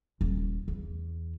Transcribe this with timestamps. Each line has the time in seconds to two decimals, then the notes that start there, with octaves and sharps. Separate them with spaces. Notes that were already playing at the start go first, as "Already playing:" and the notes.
0.21 D#1
0.68 E2